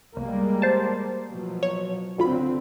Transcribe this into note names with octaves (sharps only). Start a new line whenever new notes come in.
C2 G3 G#3 A#3
C5 A5
B2 F3 F#3
C#5
D2 D3 C4 F4 B5